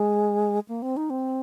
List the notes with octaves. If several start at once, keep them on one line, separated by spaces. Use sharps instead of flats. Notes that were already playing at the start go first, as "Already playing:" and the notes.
Already playing: G#3
A#3
C4
D#4
C4